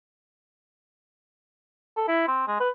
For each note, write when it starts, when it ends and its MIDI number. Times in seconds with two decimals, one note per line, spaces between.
1.96 2.08 69
2.08 2.25 64
2.27 2.44 60
2.47 2.57 56
2.60 2.69 71